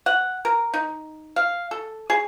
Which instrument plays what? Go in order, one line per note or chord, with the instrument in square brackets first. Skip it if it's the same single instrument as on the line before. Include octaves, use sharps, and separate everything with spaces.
[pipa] F#5
A#4
D#4
F5
A4
G#4